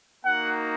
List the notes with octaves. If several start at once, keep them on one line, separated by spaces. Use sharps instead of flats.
A#3 D#4 F#4 F#5